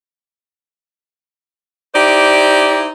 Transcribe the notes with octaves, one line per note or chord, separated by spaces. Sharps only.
D#4 E4 G4 C5 D5